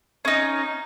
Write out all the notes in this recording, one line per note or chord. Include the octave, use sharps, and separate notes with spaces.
C#4 D#4